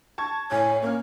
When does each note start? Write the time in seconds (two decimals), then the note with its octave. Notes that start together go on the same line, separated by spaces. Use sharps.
0.18 A5 C#6 G#6
0.52 A2 C#5 G#5
0.82 A#3 C#4 C#5 F6